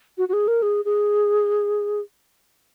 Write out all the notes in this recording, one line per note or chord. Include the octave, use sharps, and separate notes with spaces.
F#4
F#4
G#4
A#4
G#4
G#4